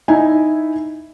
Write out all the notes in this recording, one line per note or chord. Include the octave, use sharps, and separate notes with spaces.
D#4 E4 G#5